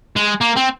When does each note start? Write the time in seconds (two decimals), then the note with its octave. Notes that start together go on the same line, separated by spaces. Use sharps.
0.16 G#3
0.41 A#3
0.56 C4